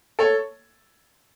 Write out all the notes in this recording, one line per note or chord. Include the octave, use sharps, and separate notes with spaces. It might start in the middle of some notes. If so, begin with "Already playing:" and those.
A4 C#5